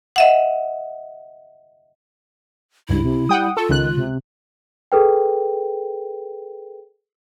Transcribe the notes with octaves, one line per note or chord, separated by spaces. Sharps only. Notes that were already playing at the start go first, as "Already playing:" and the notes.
D#5 E5 F#5
C#2 G2 E4
C3
G3 F#5 G5 D#6
F4 A4 C#6
C#2 D#3 F#6
C3
G#4 A4 B4 G5